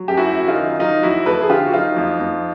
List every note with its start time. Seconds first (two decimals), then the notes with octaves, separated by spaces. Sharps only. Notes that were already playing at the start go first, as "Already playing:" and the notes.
Already playing: F#3
0.08 F#2 G4
0.17 E4 F#4
0.33 F#2
0.48 D#4 F4
0.56 D#3
0.79 F#3 D#4 F4
1.03 F2 E4 F#4
1.26 F2 A4 B4
1.41 G#4
1.49 D3 F4 G4
1.67 F#4
1.72 F#3 D#4 F4
1.96 F2
2.20 F2